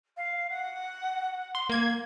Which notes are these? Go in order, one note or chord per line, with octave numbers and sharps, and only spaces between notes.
F5
F#5
C6
A#3 G#6